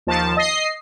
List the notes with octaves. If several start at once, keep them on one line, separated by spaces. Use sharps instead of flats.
D#2 F3 A5
D#5 C7